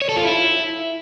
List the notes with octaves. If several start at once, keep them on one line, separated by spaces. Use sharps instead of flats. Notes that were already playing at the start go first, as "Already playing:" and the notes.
C#5
A4
F4
E4